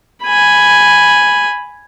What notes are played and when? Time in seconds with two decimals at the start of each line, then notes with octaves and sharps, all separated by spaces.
0.24 G#5 B5